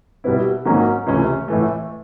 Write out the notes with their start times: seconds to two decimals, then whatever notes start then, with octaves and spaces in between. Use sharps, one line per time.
0.24 B2 G3 B3 E4
0.65 G#2 D#3 F#3 A#3 C#4
1.06 C#2 C3 E3 A3 C#4
1.48 A2 E3 A3